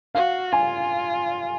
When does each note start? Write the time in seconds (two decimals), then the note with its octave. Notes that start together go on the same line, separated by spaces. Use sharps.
0.15 F#4 F5
0.52 F4 G#5